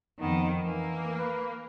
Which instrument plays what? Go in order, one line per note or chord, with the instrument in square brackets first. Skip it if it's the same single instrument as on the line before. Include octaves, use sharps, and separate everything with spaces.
[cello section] F2 D#3 [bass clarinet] B3
[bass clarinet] E3 [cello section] A#3
[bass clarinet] B4